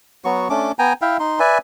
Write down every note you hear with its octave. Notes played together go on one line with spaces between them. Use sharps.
F#3 B3 F#4 C#6
A3 C#4 D4 D6
B3 G5 G#5 A#5
E4 E5 F5 G5
D#4 C6
B4 D5 E5 G#5